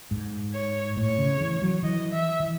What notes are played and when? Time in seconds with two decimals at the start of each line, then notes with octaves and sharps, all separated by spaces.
0.11 G#2
0.54 C#5
0.97 A2 C#5
1.18 C#3
1.40 E3
1.62 F#3
1.83 E3 D#5
2.12 E5
2.40 E3